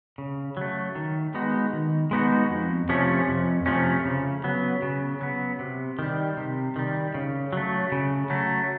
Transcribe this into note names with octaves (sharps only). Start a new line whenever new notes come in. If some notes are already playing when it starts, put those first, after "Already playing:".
C#3
F#3 A3
D#3
G#3 B3 D#4 F#4
D#3
G#3 B3 D#4 F#4
F2
C3 F3 A3 C#4
F2
C3 F3 A3 C#4
C#3
F#3 B3
C#3
F#3 B3
C3
D#3 G3
C3
D#3 G3
C#3
F#3 A3
C#3
F#3 A3